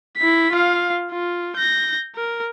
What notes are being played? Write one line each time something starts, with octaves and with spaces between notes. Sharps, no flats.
E4 B6
F4 F5
F4
G6 A#6
A#4